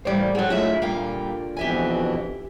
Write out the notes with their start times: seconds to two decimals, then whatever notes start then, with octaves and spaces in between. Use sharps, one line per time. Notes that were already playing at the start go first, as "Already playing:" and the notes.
0.05 A2 E3 G3 A#3 C5 D5
0.35 F#3 C4 F#4 G#4 A4
0.50 D3 F#3 G#3 A3 E4 F4 E5
0.82 A#2 G3 A#3 F5 G5
1.57 F2 B2 E3 G4 E5 G#5